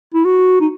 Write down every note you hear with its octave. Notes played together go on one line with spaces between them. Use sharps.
E4
F#4
D#4